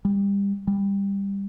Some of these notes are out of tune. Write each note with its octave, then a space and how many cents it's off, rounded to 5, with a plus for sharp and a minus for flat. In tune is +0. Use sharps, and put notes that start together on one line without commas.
G3 +25
G3 +15